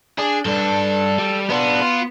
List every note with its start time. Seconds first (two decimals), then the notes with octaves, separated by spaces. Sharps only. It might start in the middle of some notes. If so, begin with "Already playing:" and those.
0.18 D4 G#4
0.45 G2 D4 A4
1.19 G3
1.50 B3 D4 F4
1.81 F4